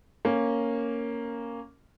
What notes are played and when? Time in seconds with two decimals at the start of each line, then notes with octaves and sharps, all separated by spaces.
0.25 A#3 C#4